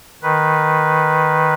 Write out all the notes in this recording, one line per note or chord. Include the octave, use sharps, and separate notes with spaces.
D#3 B4